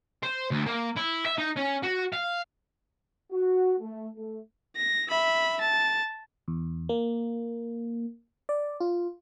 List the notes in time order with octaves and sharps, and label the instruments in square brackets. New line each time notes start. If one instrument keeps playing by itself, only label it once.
[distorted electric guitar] C5
D2
A#3
E4
E5
D#4
C#4
F#4
F5
[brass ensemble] F#4
A3
A3
[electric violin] A#6
E5 B5
A5
[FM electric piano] E2
A#3
D5
F4